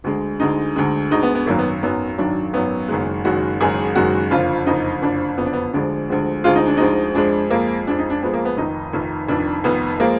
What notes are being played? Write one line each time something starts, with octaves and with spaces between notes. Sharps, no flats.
D2 D3 G#3
D2 D3 G#3 D#4
D2 D3 G#3
D2 D3 G#3 D#4
B3
B3
G#1 F#2 D#3 F#3 A#3
B3
G#1 F#2 D#3 F#3 B3
G#1 F#2 D#3 F#3 D4
G#1 F#2 D#3 F#3 B3
F#1 F#2 D#3 G#3
F#1 F#2 D#3 G#3 F#4
F#1 F#2 D#3 G#3 G#4
F#1 F#2 D#3 G#3 F#4
F#1 F2 D3 F3 F4
F#1 F2 D3 F3 D#4
F#1 F2 D3 F3 D4
F#1 F2 D3 F3 B3
D4
B3
D2 D3 F3 G#3 D4
D2 D3 F3 G#3
D2 D3 F3 G#3 F4
D#4
D4
D2 D3 F3 G#3 D#4
F2 F3 G#3 D4
F2 F3 G#3 A#3
F2 F3 G#3 D4
D#4
D4
F2 F3 G#3 B3
A#3
B3
F1 F2 D#3 D#4
F1 F2 D#3
F1 F2 D#3 D4
F1 F2 D#3 B3
F3 G#3 A#3